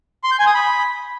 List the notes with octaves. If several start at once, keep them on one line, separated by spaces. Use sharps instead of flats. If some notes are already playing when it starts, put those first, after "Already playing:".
C6
G6
G#5
D#6
B5